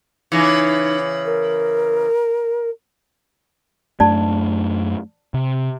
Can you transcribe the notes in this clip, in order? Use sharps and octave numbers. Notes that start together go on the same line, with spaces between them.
C#3 E3 D#4
A#4
F#2 A3 D4 D5 A5
C3